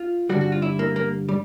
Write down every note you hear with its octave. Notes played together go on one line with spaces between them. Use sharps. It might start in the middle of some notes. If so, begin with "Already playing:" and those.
Already playing: F4
G2 D3 G3 F#4
F#4
F4
E4
A#3
A#3
G3